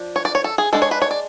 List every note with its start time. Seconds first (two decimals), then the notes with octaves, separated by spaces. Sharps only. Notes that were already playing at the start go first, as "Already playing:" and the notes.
Already playing: F3 D4
0.16 C#5
0.25 D5
0.35 C#5
0.44 A4
0.58 G#4
0.73 G#3 D4 A4
0.82 C#5
0.91 B4
1.02 C#5
1.11 D5